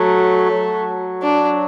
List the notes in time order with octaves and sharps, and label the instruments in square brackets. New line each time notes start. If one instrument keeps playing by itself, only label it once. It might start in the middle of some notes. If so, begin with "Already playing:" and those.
Already playing: [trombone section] F#3 [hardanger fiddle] A3
[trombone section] F#3
[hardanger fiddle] D4